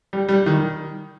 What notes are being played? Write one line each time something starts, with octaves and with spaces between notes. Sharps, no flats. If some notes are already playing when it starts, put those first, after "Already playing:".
G3
G3
D#3